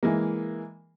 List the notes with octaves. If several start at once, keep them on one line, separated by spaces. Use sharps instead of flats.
E3 G#3 A#3